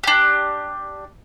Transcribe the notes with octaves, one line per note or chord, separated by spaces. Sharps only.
D4 G4